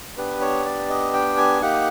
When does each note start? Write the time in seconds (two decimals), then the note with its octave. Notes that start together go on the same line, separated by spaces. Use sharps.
0.17 B3 D4 G4 B4
0.41 C#5
0.65 D5
0.89 D#5
1.14 G5
1.37 G#5
1.62 A#3 D#4 G4 F#5